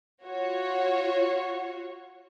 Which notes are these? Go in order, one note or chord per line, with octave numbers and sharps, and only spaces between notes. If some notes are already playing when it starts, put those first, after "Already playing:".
F4 F#4 C#5